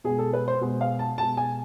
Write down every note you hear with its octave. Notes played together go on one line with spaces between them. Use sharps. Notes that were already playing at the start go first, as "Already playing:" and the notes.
B2 G#3 G#4
A4
B4
C5
B2 G#3
F5
A5
B2 G#3 A5
G#5